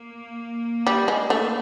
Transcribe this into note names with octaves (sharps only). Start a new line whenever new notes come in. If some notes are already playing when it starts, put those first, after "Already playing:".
Already playing: A#3
G3
G#3
A3